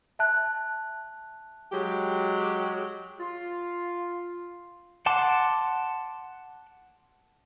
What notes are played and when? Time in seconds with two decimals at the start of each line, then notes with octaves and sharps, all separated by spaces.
0.19 E5 A5 F#6
1.72 F#3 G#3 G4
3.19 F4
5.06 F#5 A5 C6 D6